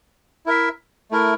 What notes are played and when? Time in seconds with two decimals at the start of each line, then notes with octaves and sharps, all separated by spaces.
0.46 E4 A#4 E5
1.11 A3 E4 A#4